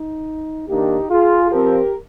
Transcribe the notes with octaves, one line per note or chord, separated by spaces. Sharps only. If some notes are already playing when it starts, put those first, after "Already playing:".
Already playing: D#4
D#3 A#3 D4 D#4 G4
F4 G#4
F3 C4 G4 A#4